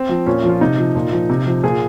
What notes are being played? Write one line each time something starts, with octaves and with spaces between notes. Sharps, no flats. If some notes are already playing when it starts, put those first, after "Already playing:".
Already playing: C4
F3
A#2 C#4
F3
F4
C3 D#4
F3
A#2
F3
C3
F3
A#2 G#4